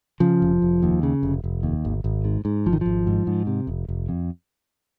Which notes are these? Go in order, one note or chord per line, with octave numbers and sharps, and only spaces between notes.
C#3 F3
F1
F1
D#2
C#3
F1
F1
D#2
G#1
G#1
G#2
G#2
G#1 F3
D#3
G#1 F3
G#2
G#2
C3
F1
F1
F2